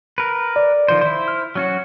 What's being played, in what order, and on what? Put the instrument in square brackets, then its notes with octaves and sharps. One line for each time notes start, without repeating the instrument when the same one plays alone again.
[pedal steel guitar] A#4 B4
[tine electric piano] D5
[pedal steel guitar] D#3 F3 C5
E4 C5
[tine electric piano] F6
[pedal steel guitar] F#3 C#4 F#4